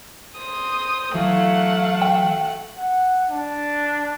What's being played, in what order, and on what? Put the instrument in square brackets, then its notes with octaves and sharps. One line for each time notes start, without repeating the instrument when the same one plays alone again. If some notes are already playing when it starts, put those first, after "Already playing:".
[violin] C5 D#6
[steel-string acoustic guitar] E3 F#3 [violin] A3 F#5 [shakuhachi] F5
[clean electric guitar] G5
[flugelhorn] F#5
D4